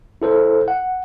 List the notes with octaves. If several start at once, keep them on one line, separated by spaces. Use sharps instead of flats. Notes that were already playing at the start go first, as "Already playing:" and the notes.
E4 A4 C5
F#5